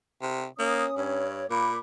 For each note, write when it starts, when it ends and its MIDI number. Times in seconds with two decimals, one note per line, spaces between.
0.22 0.45 48
0.60 0.86 58
0.60 1.21 61
0.60 0.95 87
0.97 1.44 43
0.97 1.46 73
1.50 1.77 46
1.50 1.71 58
1.50 1.79 83
1.50 1.79 86